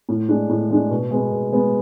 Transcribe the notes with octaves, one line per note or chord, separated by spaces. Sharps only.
A2
G#3 D4
A2
G#3 D4
B2
G#3 B3
B2
G#3 B3